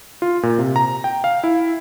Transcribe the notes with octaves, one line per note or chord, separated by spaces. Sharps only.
F4
A#2
C3
A#5
G5
F5
E4